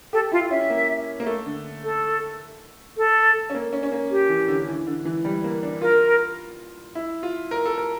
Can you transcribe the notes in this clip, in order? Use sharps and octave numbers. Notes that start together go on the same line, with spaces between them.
G4 A4
E4 F4
C#4 E5
A#3
A#3
A3
D3
A4
A4
C#4
A#3
C#4
C#4
A#3
G4
E3
D3
E3
D3
E3
G3
A#3
D4
F4 A#4
E4
F4
A#4
A4
A#4